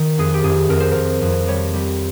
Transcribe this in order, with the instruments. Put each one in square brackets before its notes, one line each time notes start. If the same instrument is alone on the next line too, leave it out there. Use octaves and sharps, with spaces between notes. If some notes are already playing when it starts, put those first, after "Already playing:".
Already playing: [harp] D#3
F2 G#4
G4
F2 G#4
F2 A#4
C5
F2 A#4
F2
G3 C#5
G3